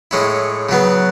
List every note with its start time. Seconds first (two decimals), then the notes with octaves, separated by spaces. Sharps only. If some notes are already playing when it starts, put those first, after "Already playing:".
0.11 A2 G#3 C#4 E4
0.69 C#3 F#3 B3